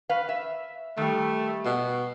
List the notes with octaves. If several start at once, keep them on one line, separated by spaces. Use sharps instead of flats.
B4 F5
E5
D#3 G3 A3
B2